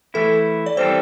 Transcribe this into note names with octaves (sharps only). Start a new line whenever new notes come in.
E3 A3 E4 A4
D5
E3 G3 C4 A4 C5